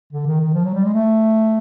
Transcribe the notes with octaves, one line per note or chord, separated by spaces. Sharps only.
D3
D#3
D#3
F3
F#3
G3
G#3
A3